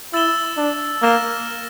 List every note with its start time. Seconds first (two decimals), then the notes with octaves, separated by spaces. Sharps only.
0.13 E4 E6 A6 E7 G7
0.57 D4
1.02 A#3 F6 A#6 E7